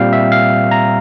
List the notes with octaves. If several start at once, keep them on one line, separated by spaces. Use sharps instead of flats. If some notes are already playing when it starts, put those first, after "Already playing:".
Already playing: A#2 G3 C4 F5 G5
E5
F5
A#5